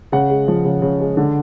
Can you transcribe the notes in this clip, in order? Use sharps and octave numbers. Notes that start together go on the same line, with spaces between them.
C#3 F#5
G#3
F3
C#3
C#3
G#3
D3